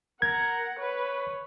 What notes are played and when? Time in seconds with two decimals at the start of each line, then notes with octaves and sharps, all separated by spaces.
0.22 A#4 F#5 G#6
0.79 B4 C#5